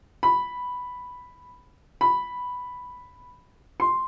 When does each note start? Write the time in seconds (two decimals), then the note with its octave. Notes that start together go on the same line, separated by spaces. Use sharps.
0.23 B5
2.01 B5
3.80 C6